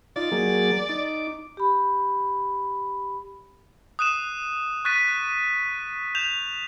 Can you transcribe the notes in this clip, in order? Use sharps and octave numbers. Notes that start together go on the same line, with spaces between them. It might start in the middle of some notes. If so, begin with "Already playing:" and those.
D#4 F4 D5
F#3 A#3 G#4
D#4 D6
G4 B5
D#6 F#6 D#7 E7
C#6 F#6 A6 B6 D#7
G6 E7 F7